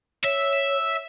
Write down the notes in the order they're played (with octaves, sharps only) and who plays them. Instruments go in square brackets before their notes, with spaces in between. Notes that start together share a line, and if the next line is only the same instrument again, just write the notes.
[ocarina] C#5 [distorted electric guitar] E5